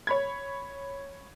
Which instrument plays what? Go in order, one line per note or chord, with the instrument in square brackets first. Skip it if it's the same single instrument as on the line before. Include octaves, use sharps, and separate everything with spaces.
[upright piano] C#5 B5 G#6